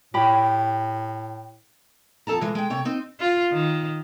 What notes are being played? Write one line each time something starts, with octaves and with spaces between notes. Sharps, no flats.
A2 G4 G5 B5
F2 A4 A5 A#5
E3 G#3
G#3 G5
C3 C#5 G5
C4 D#4
F4
D#3